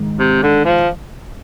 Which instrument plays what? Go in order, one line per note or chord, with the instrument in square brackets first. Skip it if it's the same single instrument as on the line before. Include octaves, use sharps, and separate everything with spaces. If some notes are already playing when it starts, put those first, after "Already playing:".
Already playing: [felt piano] G#2 D#3 D#4
[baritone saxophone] C3
D3
F3